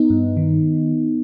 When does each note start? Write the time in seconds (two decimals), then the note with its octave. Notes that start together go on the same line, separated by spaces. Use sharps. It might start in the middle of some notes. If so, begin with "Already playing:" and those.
Already playing: B3 D#4
0.10 G2
0.37 D#3